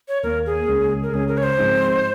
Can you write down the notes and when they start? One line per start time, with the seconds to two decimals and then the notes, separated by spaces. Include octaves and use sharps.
0.08 C#5
0.23 D#2 D#3 A#3 A#4
0.46 G#4
0.68 C#2 C#3 G#3 C#4
1.03 A#4
1.13 C#2 C#3 G#3 C#4 G#4
1.28 A#4
1.38 C#5
1.43 C5
1.58 G#2 F3 G#3 C4 D#4